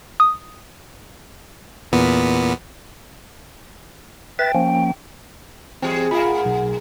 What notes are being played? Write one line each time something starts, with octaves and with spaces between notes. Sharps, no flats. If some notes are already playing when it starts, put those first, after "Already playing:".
D#6
E2 A#2 B3
B4 E5 G5 A6
F3 A#3 C#4
E3 G3 C4 G#4
A2 F4 G#4 A#4 F5 B5
F#5
B1